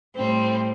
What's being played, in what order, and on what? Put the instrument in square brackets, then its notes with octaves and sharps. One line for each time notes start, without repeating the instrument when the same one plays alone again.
[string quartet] A2 G3 C4